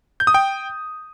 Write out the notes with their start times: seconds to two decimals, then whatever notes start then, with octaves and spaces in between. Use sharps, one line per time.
0.20 G6
0.27 D#6
0.34 G5